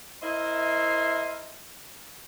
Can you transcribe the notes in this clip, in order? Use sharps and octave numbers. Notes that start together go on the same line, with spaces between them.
E4 A#4 C5 D#5 E5